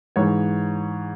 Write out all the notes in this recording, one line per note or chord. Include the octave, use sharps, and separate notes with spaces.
G#2 E3 C#5